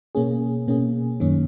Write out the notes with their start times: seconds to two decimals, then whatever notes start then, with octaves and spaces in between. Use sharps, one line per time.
0.15 B2 A#3 C#4 G#4
0.68 B2 A#3 C#4 G#4
1.20 F#2 D#3 A#3 C#4